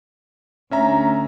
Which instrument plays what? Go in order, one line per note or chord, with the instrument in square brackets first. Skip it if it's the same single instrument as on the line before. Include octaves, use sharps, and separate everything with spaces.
[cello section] D2 [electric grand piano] C#4 E5 A#5